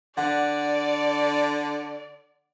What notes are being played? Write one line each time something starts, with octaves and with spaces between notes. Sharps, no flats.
D3 D5 F#5